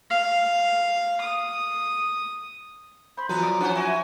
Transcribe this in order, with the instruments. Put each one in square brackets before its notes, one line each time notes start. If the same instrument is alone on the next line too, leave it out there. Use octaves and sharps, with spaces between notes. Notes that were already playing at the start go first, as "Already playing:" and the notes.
[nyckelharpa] F5
D#6
[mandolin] C5 C6 [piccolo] B5
[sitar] E2 B3 B4 [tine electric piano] F3 F#3 [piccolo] A#5
[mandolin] D5 D#6 F6
[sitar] C#4 C5 [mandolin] B4 F#5 G5
[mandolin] E4 [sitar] F#4 [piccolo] G#5